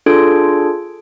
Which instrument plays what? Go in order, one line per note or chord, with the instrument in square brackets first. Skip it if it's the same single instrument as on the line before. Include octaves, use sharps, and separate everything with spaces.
[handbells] D4 F4 G#4 A4 G#6 D7